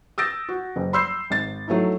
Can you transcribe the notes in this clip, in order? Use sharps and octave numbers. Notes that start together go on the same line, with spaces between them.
D#6 E6 G6 A6 A#6 D7
F#4
F#1
B5 C6 E6 G6 C7
G#1 A6
F#3 A3 D#4 E4